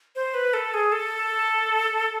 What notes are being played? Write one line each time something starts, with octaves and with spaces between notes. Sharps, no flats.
C5
B4
A4
G#4
A4